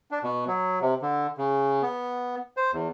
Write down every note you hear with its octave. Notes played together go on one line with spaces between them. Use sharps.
D4
B2
F#3
C3
D3
C#3
B3
C5
E2